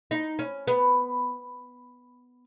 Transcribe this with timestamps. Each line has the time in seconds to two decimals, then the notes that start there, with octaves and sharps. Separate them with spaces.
0.11 D#4
0.39 C#4
0.67 B3